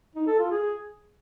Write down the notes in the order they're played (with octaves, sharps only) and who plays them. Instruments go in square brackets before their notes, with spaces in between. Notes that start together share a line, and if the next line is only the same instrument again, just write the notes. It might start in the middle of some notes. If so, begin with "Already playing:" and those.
[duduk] D#4
A4
F4
G#4